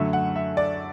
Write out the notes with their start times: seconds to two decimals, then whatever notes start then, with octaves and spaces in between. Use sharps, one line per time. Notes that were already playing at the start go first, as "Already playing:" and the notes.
Already playing: F#2 D3 F#3 A3 E5
0.13 F#5
0.36 E5
0.57 D5